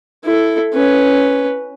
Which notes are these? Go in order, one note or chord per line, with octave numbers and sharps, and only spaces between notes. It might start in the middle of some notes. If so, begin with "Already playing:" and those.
E4 A4
C#4 B4